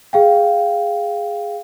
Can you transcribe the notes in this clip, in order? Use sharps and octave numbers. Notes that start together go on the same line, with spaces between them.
G#4 F5 G5